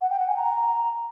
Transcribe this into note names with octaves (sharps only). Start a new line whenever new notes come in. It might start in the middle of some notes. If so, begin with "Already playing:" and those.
F#5
G5
F#5
G#5
A#5